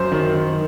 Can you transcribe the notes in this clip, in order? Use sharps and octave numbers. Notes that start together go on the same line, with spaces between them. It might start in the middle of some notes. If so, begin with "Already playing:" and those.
Already playing: F#2 C5
D#3
D#3